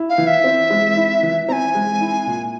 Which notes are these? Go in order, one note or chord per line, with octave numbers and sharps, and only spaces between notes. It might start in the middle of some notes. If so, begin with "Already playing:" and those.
Already playing: E4
F5
E3
E5
C4
G#3
E4
E3
C4 G#5 A#5
G#3
E4
A#2